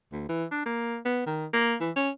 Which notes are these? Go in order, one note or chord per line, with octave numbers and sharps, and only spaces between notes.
D2
E3
D4
A#3
B3
D#3
A#3
E3
C#4